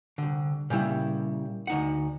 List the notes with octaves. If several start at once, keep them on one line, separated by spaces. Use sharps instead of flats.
C2 D3
A#2 C#3 G3 E4
D2 D#4 F#5